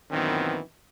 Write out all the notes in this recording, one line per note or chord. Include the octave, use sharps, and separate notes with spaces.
F#2 A#2 D#3 E3 B3 C4